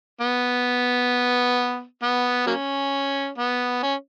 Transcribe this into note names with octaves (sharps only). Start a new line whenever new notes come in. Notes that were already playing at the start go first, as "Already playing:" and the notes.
B3
B3
F#3 A#3 C#4
B3
C#4